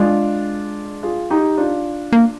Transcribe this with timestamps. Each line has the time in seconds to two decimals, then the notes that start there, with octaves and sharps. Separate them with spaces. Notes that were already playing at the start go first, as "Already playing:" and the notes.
Already playing: G#3 D4 F4
1.03 F4 G#4
1.30 D#4 G4
1.57 D4 F4
2.13 A#3